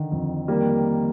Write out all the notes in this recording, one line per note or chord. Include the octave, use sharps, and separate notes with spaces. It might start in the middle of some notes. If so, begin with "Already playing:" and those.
Already playing: D3 D#3
F2
D#3 G3 A#3